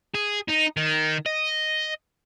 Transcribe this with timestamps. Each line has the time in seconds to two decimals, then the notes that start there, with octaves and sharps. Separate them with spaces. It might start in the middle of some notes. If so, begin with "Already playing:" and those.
0.14 G#4
0.48 D#4
0.77 D#3
1.26 D#5